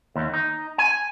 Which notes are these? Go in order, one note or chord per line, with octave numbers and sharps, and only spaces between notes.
D#2
D#4
G#5